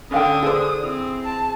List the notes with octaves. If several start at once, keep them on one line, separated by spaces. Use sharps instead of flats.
D3 C#4 F5 G5 D#6
G#4 C5 D5
C4 E4
A5